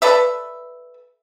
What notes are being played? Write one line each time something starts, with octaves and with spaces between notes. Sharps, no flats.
A4 B4 D5 E5